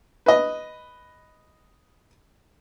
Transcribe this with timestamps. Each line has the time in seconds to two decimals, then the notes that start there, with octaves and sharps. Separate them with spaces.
0.26 B4 D#5